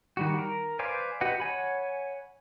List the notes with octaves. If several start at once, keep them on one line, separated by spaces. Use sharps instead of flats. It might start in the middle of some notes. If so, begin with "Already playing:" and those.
D#3 G3 F#4
A#4
B4 C5 D5 F5 G#5
F#4 G4 B4 D#5 F#5
C#5 F#5 G#5 B5